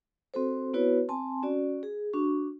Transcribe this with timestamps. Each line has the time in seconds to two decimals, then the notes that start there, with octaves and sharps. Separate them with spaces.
0.34 C4 F#4 A4 C5
0.74 B3 E4 F#4 B4 C#5
1.09 C4 G#5 A5 C6
1.43 C#4 F#4 D5
1.83 G#4
2.13 D4 F#4 C#6